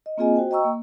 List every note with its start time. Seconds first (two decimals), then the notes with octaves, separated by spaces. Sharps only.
0.06 D#5
0.17 A#3 C4 F4 G#4 D#5 G#5
0.36 F#4 C5 G5
0.51 D#5 G5 A#5 C#6 E6
0.65 A#3